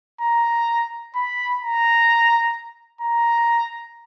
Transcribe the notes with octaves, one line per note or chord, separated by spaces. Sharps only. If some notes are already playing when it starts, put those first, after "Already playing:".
A#5
B5
A#5
A#5